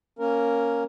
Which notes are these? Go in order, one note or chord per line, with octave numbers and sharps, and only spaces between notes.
A#3 C#4 A#4